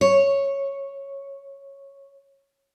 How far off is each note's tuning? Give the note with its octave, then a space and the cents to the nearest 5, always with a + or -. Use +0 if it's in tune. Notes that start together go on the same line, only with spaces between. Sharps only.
C#5 -5